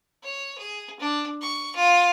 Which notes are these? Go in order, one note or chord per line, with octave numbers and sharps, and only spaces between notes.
C#5
G#4
D4
C#6
F4